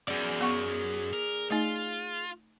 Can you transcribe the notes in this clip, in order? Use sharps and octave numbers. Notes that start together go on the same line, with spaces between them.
F#2 G#4 D5
B3 F#5 C#6
A#4
A3 D#4 F4